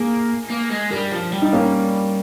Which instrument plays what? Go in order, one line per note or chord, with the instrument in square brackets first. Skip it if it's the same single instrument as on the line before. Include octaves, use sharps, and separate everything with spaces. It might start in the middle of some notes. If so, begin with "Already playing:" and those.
Already playing: [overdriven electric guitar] A#3 [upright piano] G#4
[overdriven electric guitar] A#3
G#3
[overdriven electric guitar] G3 [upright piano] G4 A#4
[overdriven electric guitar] F3
G3
[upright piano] D#4
A#3 C#4